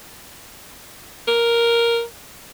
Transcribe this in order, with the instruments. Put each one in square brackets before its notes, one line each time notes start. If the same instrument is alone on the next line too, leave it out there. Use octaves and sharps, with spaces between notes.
[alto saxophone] A#4